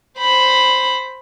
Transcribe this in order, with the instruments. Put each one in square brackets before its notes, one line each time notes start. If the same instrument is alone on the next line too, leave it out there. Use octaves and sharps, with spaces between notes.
[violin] C5 B5